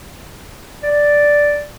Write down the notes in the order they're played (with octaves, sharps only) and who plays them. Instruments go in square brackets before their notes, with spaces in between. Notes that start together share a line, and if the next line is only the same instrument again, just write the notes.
[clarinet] D5